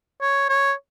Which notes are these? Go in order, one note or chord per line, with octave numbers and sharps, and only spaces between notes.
C#5
C#5